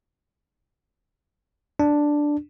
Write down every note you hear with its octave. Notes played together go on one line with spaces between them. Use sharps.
D4